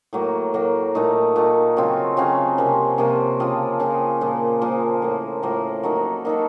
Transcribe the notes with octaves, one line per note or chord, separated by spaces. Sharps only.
A2 F#3 A#3
A2 F#3 A#3
A#2 A3 D#4
A#2 A3 D#4
C#3 F#3 C4 F4
C#3 F#3 C4 F4
C3 F3 A#3 C#4
C3 F3 A#3 C#4
C#3 F3 C4
C#3 F3 C4
A#2 F3 A#3
A#2 F3 A#3
A2 F3 A#3
A2 F3 A#3
F#3 A#3 D#4 A4
F#3 A#3 D#4 A4